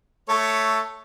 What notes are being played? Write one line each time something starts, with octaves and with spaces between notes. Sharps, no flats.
A3 A4 C#5